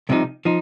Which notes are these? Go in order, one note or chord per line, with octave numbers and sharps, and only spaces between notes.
C2 C3 F3 D#4
F3 D#4